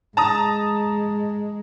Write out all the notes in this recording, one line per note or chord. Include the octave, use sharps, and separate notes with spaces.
G#3 A5 A#5 D#6